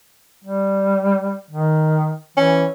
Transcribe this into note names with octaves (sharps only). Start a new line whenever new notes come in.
G3
D#3
E3 C#4